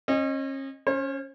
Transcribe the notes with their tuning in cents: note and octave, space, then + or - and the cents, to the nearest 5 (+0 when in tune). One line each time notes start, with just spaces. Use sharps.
C#4 -40 D#5 -15
C#4 +0 C5 +45